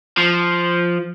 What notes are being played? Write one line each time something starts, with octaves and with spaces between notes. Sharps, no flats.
F3